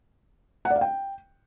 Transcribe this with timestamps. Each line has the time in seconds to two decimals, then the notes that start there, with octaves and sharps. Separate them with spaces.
0.65 F#5
0.70 D5
0.76 F5
0.81 G5